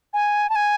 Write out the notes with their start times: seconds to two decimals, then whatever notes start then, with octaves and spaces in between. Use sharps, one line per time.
0.14 G#5
0.50 A5
0.56 G#5